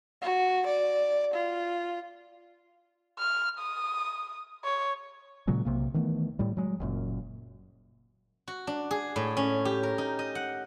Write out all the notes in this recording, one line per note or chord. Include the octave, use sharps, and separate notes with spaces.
F#4
D5
F4
F6
D#6
C#5
A#2 C#3 F#3 G#3
B1 C3 A#3
D#3 E3 A3 B3
A2 G3
F#3 G#3
F#1 F#2 A#2
F#4
D4
G#4
A2
C#4
G4
A#4
D#4
D#5
F#5